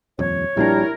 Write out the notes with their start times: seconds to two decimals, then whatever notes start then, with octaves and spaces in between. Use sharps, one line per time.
0.19 D#1 F2 C#5
0.57 A#1 A#2 G3 D4 E4 A#4